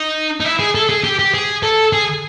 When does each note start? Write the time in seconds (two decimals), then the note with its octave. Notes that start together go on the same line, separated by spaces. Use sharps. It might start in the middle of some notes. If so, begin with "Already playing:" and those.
Already playing: D#4
0.40 D#4
0.45 E4
0.59 G#4
0.75 A4
0.89 G#4
1.04 G4
1.19 G4
1.34 G#4
1.63 A4
1.93 G#4